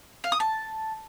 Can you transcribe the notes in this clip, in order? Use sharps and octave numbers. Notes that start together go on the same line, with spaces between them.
F5
D#6
A5